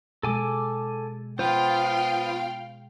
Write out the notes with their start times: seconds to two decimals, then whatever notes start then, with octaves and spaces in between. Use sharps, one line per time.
0.23 B2 G#3 A4 G#5 D6
1.39 B3 F4 C5 F5 G5